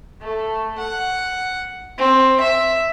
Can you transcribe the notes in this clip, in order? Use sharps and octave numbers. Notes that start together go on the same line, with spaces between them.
A3
F#5
C4
E5